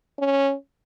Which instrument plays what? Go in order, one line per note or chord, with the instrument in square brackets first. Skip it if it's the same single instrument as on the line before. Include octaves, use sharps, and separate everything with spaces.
[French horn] C#4